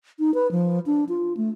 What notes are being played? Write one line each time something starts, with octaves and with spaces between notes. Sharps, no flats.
D#4
B4
F3
D4
F4
A3